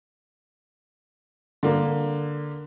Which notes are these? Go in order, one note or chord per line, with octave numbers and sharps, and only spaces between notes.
D3 A#3